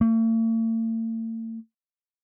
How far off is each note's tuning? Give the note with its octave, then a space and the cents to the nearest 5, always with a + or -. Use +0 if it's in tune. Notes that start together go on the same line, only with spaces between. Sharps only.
A3 +45